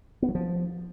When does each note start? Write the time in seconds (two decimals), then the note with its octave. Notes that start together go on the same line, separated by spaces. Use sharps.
0.22 B3
0.29 F#3
0.35 F3